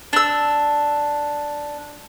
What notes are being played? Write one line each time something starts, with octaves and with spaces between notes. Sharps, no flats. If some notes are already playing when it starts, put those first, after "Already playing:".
D4 E6